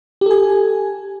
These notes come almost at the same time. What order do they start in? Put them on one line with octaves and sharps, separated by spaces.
G4 A4 G#5